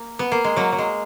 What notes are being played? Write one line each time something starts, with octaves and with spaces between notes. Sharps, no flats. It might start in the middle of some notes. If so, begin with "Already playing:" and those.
Already playing: A#3
B3
A#3
G#3
F#3 A#3
F#3
G#3